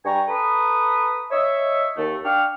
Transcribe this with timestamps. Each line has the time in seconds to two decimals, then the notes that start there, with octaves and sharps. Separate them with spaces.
0.05 G2 G3 G5 G#5 A#5 C#6
0.28 A4 B4 A#5 B5 D#6
1.31 C#5 D#5 E5
1.97 D#2 A3
2.25 D4 F5 G5 C#6 F6